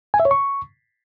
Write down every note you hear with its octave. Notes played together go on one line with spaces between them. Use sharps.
G#5
E5
C#5
C#6